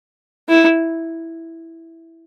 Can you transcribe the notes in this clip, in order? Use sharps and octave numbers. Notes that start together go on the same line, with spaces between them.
E4